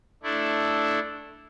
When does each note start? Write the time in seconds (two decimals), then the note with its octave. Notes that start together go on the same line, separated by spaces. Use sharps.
0.23 A3 D4 E4